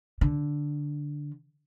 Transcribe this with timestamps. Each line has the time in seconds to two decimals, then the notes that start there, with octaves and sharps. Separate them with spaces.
0.21 D3